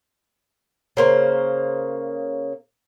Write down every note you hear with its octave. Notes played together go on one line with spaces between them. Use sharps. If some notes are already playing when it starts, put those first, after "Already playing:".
C#3 A#3 C5